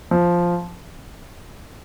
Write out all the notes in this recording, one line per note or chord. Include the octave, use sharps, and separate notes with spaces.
F3